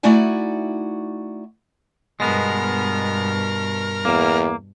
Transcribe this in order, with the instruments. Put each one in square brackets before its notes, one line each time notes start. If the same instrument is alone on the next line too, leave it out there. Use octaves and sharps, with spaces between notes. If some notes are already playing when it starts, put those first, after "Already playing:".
[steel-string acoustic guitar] A3 D#4 E4 F#4 D5 G#5
[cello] G2 B2 [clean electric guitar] G#3 B3 [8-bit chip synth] A#4 F6 A#6
[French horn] E2 [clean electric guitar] A#3